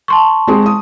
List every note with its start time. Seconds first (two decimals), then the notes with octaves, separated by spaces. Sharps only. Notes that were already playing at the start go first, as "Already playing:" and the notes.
0.08 A5 C6 C#6
0.48 G#3 C4
0.66 D#6